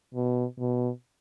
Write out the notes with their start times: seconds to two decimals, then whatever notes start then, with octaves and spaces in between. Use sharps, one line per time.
0.14 B2
0.59 B2